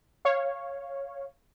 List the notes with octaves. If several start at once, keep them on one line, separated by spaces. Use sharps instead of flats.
C#5 F5